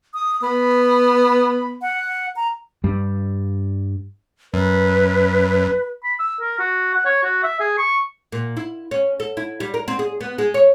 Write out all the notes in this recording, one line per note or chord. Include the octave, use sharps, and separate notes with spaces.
D#6
B3 B5
F#5
A#5
G2 G3
F#2 B4
B5
E6
A#4
F#4
F#5
C#5
F#4
E5
G#4
C#6
A#2
E4
C#4
A4
E4
G3
A#4
C4
G#4
B3
G#3
C#5